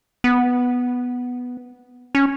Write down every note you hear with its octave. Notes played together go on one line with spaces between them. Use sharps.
B3
C#4